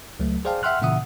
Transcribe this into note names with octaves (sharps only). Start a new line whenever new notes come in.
C#2 F#3 A3
G#4 C5 D5 F5 G5 A5
E5 F#5 G5 C6 F6 F#6
A#2 C#3 E3 E5 F#5 D#6